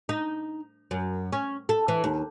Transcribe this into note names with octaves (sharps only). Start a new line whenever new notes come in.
D#4
F#2
C#4
A4
E3
D#2